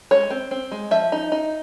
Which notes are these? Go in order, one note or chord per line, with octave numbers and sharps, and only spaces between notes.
G#3 C#5
C4
C4
G#3
F3 E5
D#4
D#4